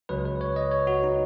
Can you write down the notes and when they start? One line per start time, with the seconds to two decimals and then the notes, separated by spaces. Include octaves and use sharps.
0.09 C#2 C#3 F#3 B4
0.25 B4
0.41 C#5
0.56 D#5
0.71 C#5
0.87 F#4
1.03 D#4